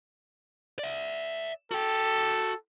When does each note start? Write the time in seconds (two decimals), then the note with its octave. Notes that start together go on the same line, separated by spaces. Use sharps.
0.79 D5 E5
1.72 F#4 A4 G5